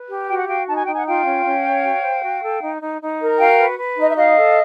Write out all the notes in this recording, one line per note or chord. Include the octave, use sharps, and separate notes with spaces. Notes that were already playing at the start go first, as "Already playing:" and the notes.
Already playing: B4
G4
F#4 G5
F#5
F#4 F5 G5
D#4 A5
G#5
D#4 G5
F#5 G#5
F4 F5 G5
C#4
C#4
C#5
F#4
C5
F#4
A4
D#4
D#4
D#4
A#4
F#4 F5 G5
B4
B4
D#4 D#5
E5
F#4 D#5 F5
A4